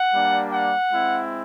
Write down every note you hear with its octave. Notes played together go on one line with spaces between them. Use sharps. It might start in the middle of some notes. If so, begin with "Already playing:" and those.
Already playing: F#5
G3 A#3 D4
F#5
G#3 C4 E4